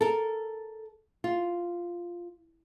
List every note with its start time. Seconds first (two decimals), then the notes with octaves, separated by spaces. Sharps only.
0.01 A4 A#4
1.24 F4